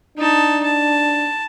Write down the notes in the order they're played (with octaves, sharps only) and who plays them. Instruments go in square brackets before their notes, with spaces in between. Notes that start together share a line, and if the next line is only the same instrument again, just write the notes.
[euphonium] D4 [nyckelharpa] D#4 A5
[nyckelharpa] A5